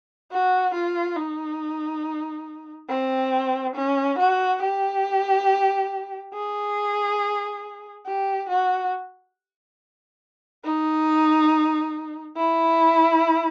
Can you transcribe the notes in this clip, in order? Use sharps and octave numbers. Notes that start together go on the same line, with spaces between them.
F#4
F4
D#4
C4
C#4
F#4
G4
G#4
G4
F#4
D#4
E4